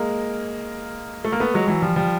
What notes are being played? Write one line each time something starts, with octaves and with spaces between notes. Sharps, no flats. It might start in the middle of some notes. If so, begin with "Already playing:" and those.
Already playing: G#3 A#3
A3
A#3
A3 B3
F#3 G#3
E3 F#3
F3 G3
F3 G3